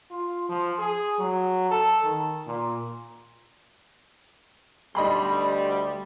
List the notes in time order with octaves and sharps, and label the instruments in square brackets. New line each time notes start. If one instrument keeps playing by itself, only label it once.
[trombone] F4
F3
G#4
F#3
A4
D#3
A#2
[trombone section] D2 G3 [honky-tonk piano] D#5 B5 C6